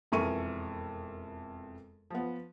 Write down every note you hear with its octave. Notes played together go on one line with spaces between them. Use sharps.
E1 F2 E3 A#4 C#6 D#7
F3 B3